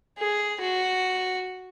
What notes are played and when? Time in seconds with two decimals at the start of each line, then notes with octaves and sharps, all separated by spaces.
0.18 G#4
0.60 F#4